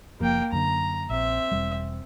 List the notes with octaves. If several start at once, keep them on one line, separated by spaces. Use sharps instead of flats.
F#1 F3 A#3 G5
F#2 D3 A#5
A#1 C4 E5
E1 G3